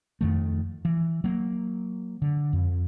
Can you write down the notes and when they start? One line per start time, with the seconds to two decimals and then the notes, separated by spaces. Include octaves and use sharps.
0.21 F2 D#3 A3
0.85 E3
1.24 F#3 A#3
2.22 D3
2.53 F2